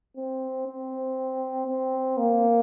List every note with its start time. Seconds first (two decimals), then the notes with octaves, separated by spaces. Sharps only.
0.17 C4
0.67 C4
1.66 C4
2.17 A#3